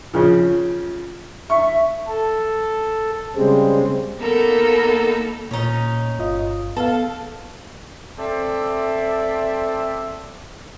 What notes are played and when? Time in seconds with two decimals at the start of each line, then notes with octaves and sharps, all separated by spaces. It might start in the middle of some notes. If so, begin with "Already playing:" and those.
0.14 C#3 F3
1.50 E5 C#6
2.07 A4
3.36 C#3 G3 G#3 C4
4.20 A#3 B3 D#4 A4 A#4
5.51 A#2 C#4 D#4
6.19 G1 F4 D#5
6.77 B3 A4 F5
8.18 C4 A4 D5 E5